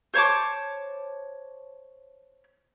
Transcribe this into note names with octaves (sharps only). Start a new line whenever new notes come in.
C5 C#5 A5 D6